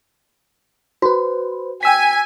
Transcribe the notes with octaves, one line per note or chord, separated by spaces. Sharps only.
F#4 B4 C5
G5 G#5 E6 B6